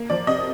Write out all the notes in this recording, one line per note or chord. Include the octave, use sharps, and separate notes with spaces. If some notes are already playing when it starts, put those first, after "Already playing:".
Already playing: A#3
F3 D5
C3 D#5